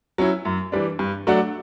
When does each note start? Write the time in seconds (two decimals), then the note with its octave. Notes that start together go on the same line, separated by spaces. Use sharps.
0.18 F#3 C#4 E4
0.45 F#2
0.72 E3 G3 D4
0.99 G2
1.27 F#3 A3 D4 F#4